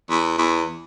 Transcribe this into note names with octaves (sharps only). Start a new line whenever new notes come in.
E2
E2